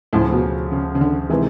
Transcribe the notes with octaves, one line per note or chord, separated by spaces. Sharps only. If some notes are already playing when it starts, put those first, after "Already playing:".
D2 A2 C#3 F3
B2
C#3
C#3
D3
C3 D#3 E3 G#3 C4